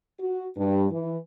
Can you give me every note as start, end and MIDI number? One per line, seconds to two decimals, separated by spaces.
0.19 0.47 66
0.57 0.86 43
0.91 1.17 52